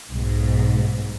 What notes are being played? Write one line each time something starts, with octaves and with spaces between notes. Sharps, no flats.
B1 G#2